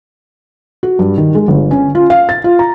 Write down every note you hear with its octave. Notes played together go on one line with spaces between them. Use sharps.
F#4
G2
D#3
G#3
G1
C#4
F4
F5
A6
F4
A#5